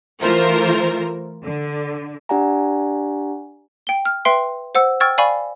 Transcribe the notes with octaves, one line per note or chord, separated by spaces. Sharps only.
E3 A3 F4 A#4 C5
D3
D4 G4 D5 F#5 G#5 A#5
G5 G7
F6
B4 E5 G5 C6 C7
C5 F#5 E6
G5 C#6 E6 F6 G#6 A6
D5 F5 G#5 B5 C#6